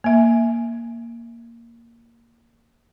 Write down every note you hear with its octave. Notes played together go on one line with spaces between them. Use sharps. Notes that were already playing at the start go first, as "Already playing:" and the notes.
A#3 E5